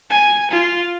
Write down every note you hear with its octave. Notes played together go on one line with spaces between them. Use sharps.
G#5
F4